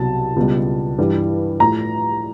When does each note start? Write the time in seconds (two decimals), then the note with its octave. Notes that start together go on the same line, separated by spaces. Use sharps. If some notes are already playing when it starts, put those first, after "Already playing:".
Already playing: C2 B2 F#3 A5
0.36 C#2 B2 G3
0.98 G2 E3 G3
1.60 A2 F3 A#5